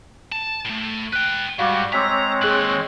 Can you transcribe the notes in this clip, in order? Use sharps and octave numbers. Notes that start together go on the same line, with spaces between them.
A5
A2 A3
B4 G5 F#6
G#2 G3 F#4 F5 D6
G#3 C4 C#5 A#5 D6 E6 B6
D#2 G#2 G#4 F#6 F#7